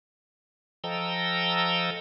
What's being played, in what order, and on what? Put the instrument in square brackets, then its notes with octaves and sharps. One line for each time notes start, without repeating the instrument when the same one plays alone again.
[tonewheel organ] F3 A4 D#5 G5 A#5 E6